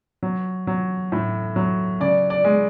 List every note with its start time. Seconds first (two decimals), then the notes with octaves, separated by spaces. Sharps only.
0.23 F#3
0.67 F#3
1.12 A2
1.56 F#3
2.00 C#3 D5
2.30 D5
2.44 G#3